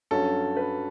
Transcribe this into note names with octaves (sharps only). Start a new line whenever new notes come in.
G2 F#3 C#4 A4
B4